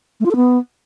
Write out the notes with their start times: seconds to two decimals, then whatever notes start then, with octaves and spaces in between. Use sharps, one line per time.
0.20 A3
0.26 F4
0.31 A4
0.36 B3